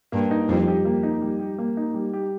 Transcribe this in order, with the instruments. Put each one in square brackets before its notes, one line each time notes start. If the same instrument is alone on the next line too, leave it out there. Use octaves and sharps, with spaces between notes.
[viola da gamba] G2 [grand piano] A#3
[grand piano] D#4
[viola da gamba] F2 [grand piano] G3
[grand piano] G4
A#3
D#4
G3
G4
A#3
D#4
G3
G4